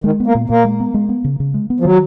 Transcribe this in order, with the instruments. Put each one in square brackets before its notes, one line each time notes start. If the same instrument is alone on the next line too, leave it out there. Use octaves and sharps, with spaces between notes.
[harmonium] D#3 [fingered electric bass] G#3
[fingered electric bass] B3
[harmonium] A#3
[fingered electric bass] A#2
[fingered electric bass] A#2 [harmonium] A#3
[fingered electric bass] G#3
B3
G#3
B3
C#3
C#3
G#3
B3
[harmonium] F3
[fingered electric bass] D#3 [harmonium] F#3